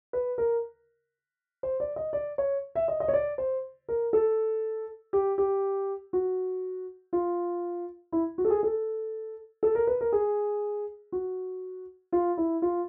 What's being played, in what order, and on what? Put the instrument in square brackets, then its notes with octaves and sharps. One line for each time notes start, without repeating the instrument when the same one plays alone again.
[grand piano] B4
A#4
C5
D5
D#5
D5
C#5
E5
D#5
D#5
C#5
D5
C5
A#4
A4
G4
G4
F#4
F4
E4
F#4
A4
G#4
A4
A4
A#4
B4
A#4
G#4
F#4
F4
E4
F4